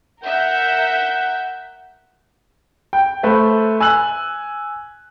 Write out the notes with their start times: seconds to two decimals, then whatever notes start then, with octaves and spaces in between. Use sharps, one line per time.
0.23 A#4 E5 F#5 G6
2.93 G5
3.23 A3 B4 C5 E5
3.80 G#5 E6 F#6 F#7